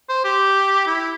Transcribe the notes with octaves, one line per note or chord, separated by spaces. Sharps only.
C5
G4
E4